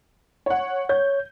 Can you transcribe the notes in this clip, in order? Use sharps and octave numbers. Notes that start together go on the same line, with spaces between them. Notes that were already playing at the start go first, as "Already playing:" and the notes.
C#5 F#5
C#5 G6